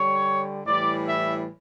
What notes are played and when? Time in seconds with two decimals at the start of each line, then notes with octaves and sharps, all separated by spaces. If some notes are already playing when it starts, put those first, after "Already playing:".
Already playing: D3 G3 C#5
0.65 A2 E3 G3 D5
1.06 E5